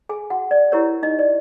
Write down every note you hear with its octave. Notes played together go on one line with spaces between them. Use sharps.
G#4 G#5
F#4 F#5
D5
E4 G4 A#4 C#5
D#4 D#5
D5